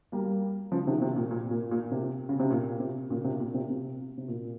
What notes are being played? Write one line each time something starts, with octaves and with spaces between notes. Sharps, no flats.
G3 A#3
C#3 F3
C3 D#3
C3
A#2
A#2
A#2
A#2
C3
C#3
C3
A#2
C3
A#2 C#3
C3
A#2
C3
C3
C3
A#2